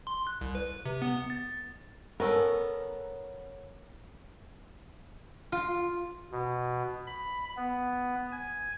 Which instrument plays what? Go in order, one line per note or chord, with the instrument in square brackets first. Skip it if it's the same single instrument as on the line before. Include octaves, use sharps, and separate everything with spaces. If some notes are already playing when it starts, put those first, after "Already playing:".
[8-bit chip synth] C6
F#6
C2
B4
C3
B3
A6
[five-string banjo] B3 C#4 A4 [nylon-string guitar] A#4
[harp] F4
[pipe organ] B2
B5
B3
G#5